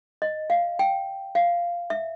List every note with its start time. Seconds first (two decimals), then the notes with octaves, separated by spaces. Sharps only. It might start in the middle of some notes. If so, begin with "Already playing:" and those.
0.22 D#5
0.50 F5
0.79 G5
1.35 F5
1.90 E5